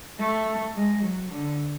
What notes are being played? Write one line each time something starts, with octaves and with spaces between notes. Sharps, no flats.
A3
G#3
F#3
D3